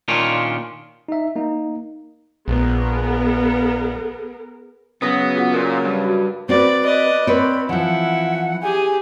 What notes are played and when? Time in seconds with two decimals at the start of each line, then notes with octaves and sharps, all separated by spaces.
0.08 A#2 D#3 C#4 D4 F4
1.08 D#4 E5
1.36 A#3 D#4
2.48 A#1 B3 G#4 A#4
5.02 C#3 F#3 B3 D#6 A#6
5.35 F4 G#4 F#5
5.54 A#2 A#4
5.85 G2
6.04 F#4
6.49 C4 F#4 B4 D5
6.86 B4 D5 D#5
7.27 C4 B4 C#5 D5 B5
7.69 E3 F3 E4 F#5
8.62 G4 G#4 G#5